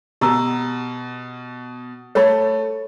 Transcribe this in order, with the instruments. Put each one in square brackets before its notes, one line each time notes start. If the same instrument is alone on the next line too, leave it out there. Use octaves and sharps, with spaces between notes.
[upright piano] B2 [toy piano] G4 A#5 E6
[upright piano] A3 A4 [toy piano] C#5 B5